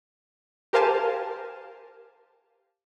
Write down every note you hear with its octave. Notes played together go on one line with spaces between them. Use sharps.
G4 A#4 C5 F5 G#5 A5